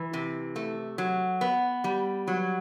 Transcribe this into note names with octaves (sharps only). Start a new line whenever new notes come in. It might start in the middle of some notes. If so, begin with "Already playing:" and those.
Already playing: E3
C3
A3
F#3
B3
G3
F#3